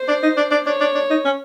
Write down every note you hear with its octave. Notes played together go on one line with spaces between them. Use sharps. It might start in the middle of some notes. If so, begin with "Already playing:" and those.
Already playing: C5
D4
D#4
D4
D4
D4 C#5
D4
D4
D#4
C#4